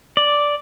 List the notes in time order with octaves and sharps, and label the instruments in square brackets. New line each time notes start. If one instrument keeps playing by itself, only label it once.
[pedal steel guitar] D5